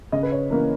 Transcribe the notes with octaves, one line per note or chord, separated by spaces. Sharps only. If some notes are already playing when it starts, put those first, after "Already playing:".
C#3 D#5
B4
C#5
E3 A#3 C#4 A#4